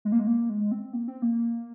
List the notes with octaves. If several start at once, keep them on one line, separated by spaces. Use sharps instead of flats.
G#3
A#3
G#3
A#3
G#3
C4
A#3
C4
A#3